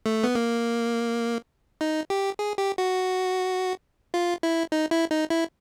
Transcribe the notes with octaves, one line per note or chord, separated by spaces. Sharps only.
A3
B3
A#3
D#4
G4
G#4
G4
F#4
F4
E4
D#4
E4
D#4
E4